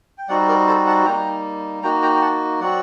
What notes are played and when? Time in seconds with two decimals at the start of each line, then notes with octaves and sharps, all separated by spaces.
0.18 G5
0.29 G3 C4 D#4 F#4 D5 F#5
0.48 A#4 D5
0.67 A4 C5
0.87 F#5 A5
1.06 G3 A#3 D#4 G5 A#5
1.83 A#3 D#4 F#4 G5 A#5
2.02 G5 A#5
2.15 G5
2.21 F#5 A5
2.60 F#3 C4 F#4 D5 F#5